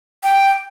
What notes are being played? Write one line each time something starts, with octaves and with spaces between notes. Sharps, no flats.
G5